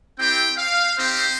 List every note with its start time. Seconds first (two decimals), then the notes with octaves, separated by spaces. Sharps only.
0.19 C4 E4 G4 G5
0.58 F5
0.98 C4 D#4 G4 C5